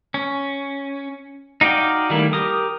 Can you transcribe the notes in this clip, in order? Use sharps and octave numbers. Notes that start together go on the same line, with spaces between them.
C#4
D#4 F#4 D5 F5 G5
D#3 G3 A3 A#3 E4
G4 A#4 D#6